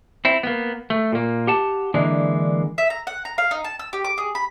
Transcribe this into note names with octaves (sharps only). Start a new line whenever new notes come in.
C4 E4
A#3 B3
A3
A#2 A#3
G4 F#5 A5
D3 E3 G#3 A#3 D4
E5
A#5
F#5
A#5
F5
D#4
A5
E6
G4
D6
G#4
B5